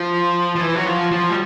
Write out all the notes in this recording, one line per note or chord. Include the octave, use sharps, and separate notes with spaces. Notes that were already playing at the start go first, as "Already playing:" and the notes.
Already playing: F3
F3
E3
F#3
F3
F3
G3